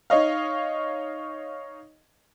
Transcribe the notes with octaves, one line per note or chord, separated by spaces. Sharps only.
D#4 C#5 D#5 F5